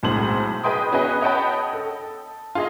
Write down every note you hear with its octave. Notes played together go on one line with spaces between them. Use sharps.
B1 A2 G#3 C4 C5 F#7
G#4 B4 D#5 G5 C6 D#6
B3 C#4 F#4 G#4 B4 D#5
C#5 D#5 F#5 G5 A5 B5
A4
F4 G#4 D#5